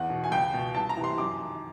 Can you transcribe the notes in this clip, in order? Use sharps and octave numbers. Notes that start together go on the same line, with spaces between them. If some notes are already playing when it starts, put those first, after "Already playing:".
Already playing: E2 F#5
B2
G#5
C#2 G5
B2
C2 A5
A#5
C3 E3
C6
F#2 D6
D#3